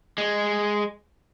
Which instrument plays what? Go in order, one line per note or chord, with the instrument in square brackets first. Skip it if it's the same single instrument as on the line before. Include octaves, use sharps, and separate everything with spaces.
[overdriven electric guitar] G#3